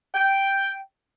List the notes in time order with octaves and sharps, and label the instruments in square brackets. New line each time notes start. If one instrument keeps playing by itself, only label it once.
[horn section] G5